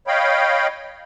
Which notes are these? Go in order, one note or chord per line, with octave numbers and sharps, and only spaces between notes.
C#5 D#5 F5 G5 B5